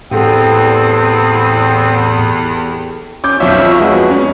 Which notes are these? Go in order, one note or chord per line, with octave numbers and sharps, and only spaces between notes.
E2 A2 C4 G4 A4 D#6
C#4 D6 G6
B1 F2 F4 C#5 E5
G#3 B3 F#4
C#4